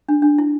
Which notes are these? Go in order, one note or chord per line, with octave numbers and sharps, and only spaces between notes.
D4
D4
E4